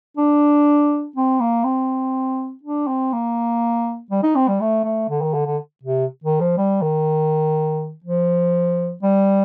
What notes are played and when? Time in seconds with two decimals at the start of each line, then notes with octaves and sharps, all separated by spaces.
0.17 D4
1.16 C4
1.40 A#3
1.64 C4
2.63 D4
2.87 C4
3.13 A#3
4.11 G3
4.23 D#4
4.35 C4
4.48 G3
4.61 A3
4.84 A3
5.09 D3
5.21 D#3
5.34 D3
5.46 D3
5.83 C3
6.24 D#3
6.40 F3
6.57 G3
6.81 D#3
8.04 F3
9.03 G3